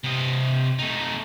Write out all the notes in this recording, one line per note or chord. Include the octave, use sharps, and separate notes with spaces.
C3 D#5
A3 D#4